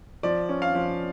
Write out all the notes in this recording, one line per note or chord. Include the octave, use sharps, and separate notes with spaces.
F3 D5
C#4
F5
F3